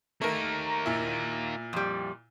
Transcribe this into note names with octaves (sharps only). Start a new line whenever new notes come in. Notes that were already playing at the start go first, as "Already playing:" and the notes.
A3 A#3 D#4 A#4
A#2 E4
F2 G3